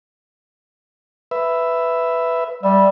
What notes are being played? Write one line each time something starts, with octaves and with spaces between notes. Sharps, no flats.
B4 E5
G3 E5